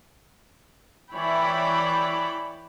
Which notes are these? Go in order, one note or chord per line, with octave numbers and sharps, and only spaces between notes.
E3 C#5 D5 E5 G5 B5